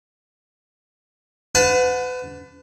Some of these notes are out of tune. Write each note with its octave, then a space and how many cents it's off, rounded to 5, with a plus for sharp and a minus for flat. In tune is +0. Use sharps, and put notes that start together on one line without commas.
B4 +35 F#5 -20 A5 +0